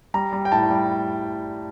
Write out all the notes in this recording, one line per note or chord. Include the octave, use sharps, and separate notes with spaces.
G3 A#5
G3
G5
A2 A5
G3